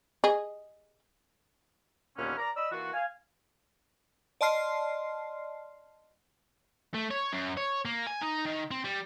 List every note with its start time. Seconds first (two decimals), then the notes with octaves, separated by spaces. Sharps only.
0.24 G#4 D#5
2.17 D#2 A#2 D3 B3 C#4 F6
2.38 A#4 D5 A#5
2.56 D5 D#5 B5 E6
2.72 E3 A#3 F4 F#4
2.93 F5 G#5
4.41 D5 D#5 A5 C6 F6 C7
6.94 A3
7.11 C#5
7.33 F#2
7.57 C#5
7.85 A#3
8.07 G#5
8.22 D#4
8.46 D#3
8.71 C4
8.84 G3